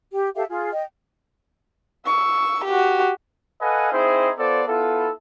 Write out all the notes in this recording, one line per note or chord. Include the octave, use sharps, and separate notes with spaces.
G4
G4 A4 E5 F5
F4 G#4
D#5 G5
C#6 E6
F#4 G4
A4 B4 D#5 F5 F#5 G#5
C4 D#4 E4 G#4 C5
B3 F4 A4 C5 D5
B3 E4 F4 A4